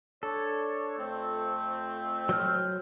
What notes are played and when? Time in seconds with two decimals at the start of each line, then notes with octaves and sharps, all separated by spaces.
0.23 D4 A4 C#5
0.97 F2 A3 C4
2.29 F#3 C5 F6